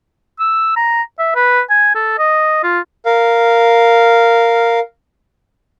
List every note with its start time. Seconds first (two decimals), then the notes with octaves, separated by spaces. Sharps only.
0.39 E6
0.76 A#5
1.19 E5
1.35 B4
1.70 G#5
1.95 A4
2.18 D#5
2.63 F4
3.06 A#4 F5